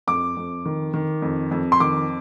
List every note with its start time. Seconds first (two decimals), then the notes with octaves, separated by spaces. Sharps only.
0.07 F2 D6
0.37 F2
0.65 D#3
0.94 D#3
1.22 F2
1.51 F2
1.72 C6
1.80 D#3 D6